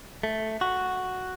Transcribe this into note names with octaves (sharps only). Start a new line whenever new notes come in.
A3
F#4